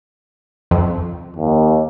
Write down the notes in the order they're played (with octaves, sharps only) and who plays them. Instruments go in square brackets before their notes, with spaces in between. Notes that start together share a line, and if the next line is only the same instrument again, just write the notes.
[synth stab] F2
[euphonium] D#2